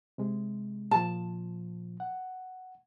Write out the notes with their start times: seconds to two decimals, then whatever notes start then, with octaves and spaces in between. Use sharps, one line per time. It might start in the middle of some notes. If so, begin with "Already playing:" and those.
0.18 C3 G#3
0.91 A#2 F3 A5
2.00 F#5